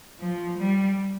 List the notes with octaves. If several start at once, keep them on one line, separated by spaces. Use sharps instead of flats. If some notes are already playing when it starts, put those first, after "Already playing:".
F3
G3